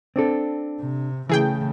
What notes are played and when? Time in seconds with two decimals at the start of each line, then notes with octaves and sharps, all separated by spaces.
0.16 C4 D4 A4
0.80 C3
1.29 C#3 E3 A3 G#4 G5